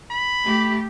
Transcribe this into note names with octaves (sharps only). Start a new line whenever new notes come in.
B5
A3 G4